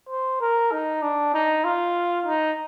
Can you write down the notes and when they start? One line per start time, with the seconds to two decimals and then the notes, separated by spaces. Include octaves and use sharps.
0.09 C5
0.41 A#4
0.72 D#4
1.02 D4
1.34 D#4
1.64 F4
2.26 D#4